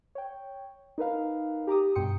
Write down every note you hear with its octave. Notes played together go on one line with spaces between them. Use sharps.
C#5 G5
D#4 A#4 B4 F5
G4 A#5 D6 D#6
G2 B2 G5 C6 D#6 C#7